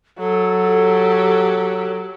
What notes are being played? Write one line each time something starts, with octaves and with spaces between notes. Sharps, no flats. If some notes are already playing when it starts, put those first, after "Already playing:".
F#3 A4
G4